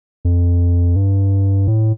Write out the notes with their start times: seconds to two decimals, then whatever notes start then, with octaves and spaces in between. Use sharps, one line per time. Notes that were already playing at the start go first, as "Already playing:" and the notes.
0.25 F2
0.96 G2
1.67 A2